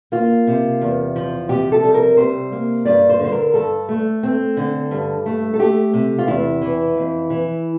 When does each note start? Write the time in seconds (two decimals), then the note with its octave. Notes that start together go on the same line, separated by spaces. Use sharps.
0.12 A#3 F4
0.47 C3
0.82 E2
1.16 F3
1.49 C3 G4
1.72 A4
1.83 G3
1.94 A#4
2.17 C3 C5
2.52 A#3
2.85 G2 D5
3.09 C5
3.20 D3
3.25 C5
3.32 A#4
3.54 G2 A4
3.89 A3
4.23 C4
4.57 D3
4.91 G2
5.26 A3
5.54 A4
5.59 A3 G4
5.94 C3
6.19 F4
6.28 E2 E4
6.61 E3
6.97 F2
7.30 E3